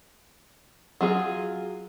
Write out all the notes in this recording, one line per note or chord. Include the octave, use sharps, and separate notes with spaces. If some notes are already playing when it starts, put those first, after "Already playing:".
F#3 F4 G#4